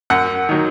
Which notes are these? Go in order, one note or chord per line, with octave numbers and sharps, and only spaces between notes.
F#2 F#5
D#3 F#3